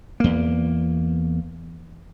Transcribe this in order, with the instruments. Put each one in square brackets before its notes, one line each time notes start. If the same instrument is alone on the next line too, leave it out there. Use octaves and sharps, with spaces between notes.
[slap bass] E2 A#3